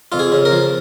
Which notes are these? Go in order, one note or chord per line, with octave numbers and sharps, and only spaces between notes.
F2 F4
G#4
C#3
A#4
F3